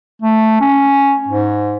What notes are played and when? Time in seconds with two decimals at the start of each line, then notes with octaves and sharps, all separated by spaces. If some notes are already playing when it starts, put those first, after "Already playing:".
0.22 A3
0.61 C#4
1.28 G#2